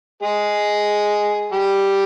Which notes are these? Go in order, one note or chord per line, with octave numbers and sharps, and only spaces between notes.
G#3 G#4
G3 G4